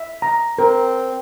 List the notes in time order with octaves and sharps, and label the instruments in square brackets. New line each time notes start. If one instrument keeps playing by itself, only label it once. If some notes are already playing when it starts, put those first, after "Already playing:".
Already playing: [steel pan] E5
A#5
[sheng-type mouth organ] C4 [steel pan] A#4